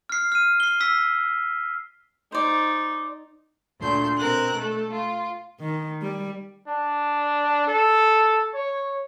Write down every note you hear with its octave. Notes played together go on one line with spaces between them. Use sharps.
F6 C7
F6 D#7
C7 G7
E6 B6 C7
D#4 C5 D5
D2 A#2 A3 C6 G6
B2 C4 A#4 F#6
A3 A4
F4
D#3
G3
D4
A4
C#5